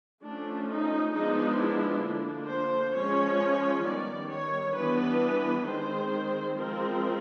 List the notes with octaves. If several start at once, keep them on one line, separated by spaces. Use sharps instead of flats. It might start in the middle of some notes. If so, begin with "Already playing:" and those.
F3 A3 C#4 D4
D#4
F3 G#3 B3 D4 D#4
E4
D3 F3 A#3 D4
C5
F3 G#3 C#4 C#5
D#3 G3 B3 D5
C#5
E3 G3 B3 D4 B4
D#3 G#3 C4 C5
F3 G#3 C4 A#4